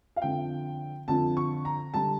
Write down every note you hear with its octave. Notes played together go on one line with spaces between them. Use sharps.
F5
F2 D3 F3 G5
F2 D3 F3 A5
C#6
A#5
D3 G3 A5